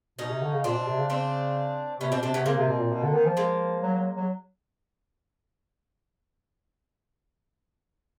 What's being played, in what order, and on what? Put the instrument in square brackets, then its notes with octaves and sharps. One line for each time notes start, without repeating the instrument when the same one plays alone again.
[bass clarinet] B2 [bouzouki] C#4 D#4
[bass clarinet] C3
D3
C#3
[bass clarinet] A#2 [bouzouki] C4 D4
[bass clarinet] B2
C3
C#3
[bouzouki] C4 D4
[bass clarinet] C3 [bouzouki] B3 C#4
[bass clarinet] B2 [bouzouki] C4 D4
[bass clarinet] C3 [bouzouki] C4 D4
[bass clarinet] C3 [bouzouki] B3 C#4
[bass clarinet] C#3 [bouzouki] A#3 C4
[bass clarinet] C3
B2
A#2
B2
D3
D#3
F3
[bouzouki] G#3 A#3
[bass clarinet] F#3
F#3
F#3